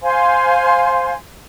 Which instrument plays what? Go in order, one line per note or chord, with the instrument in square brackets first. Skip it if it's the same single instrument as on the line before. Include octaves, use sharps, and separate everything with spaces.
[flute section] C5 F5 G#5 C6